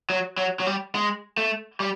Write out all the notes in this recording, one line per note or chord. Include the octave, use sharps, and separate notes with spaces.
F#3
F#3
F#3
G3
G#3
A3
G3